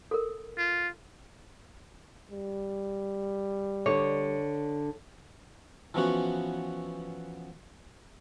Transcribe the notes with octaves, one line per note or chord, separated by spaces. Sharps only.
A4 A#4
F4
G3
D3 C#5
E3 F3 B3 C#4 F#4